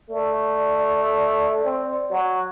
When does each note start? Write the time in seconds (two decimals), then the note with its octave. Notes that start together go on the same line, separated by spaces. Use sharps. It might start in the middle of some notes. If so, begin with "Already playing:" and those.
0.10 A3 D5
1.64 C4
2.11 F#3